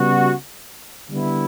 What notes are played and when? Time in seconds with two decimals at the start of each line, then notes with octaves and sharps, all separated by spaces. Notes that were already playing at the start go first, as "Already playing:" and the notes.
Already playing: C#3 G3 B3 F#4
1.09 D3 G3 B3 E4